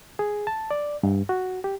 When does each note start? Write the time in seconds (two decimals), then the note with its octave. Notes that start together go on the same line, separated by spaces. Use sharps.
0.19 G#4
0.47 A5
0.71 D5
1.03 G2
1.29 F#4
1.64 G4